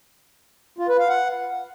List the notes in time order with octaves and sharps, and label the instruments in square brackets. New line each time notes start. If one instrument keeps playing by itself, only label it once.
[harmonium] F4
B4
F5
F#5